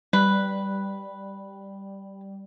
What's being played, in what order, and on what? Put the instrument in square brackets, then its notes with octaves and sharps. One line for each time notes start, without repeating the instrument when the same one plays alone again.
[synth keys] G3 [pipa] B4